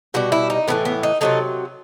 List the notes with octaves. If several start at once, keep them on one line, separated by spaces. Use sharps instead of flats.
B2 G3 F#4
E4
D#4
A2 E3 A3 B3
B3
D#4
C3 F#3 A3 D#4